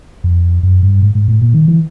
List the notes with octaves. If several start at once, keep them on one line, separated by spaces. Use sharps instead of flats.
F2
F#2
G2
G#2
G#2
A2
A#2
D#3
E3